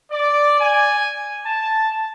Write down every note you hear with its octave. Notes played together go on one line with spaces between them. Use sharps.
D5
G#5
A5